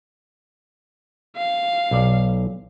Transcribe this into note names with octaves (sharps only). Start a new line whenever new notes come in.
F5
B1 D5